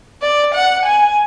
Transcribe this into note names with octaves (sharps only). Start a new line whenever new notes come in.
D5
F#5
G#5